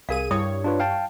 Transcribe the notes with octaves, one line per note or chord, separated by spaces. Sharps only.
C2 G#4 A#4 F5 D#7
G2 G3 E4 C#5 D#6
D4 F4 B4
F5 G5 A5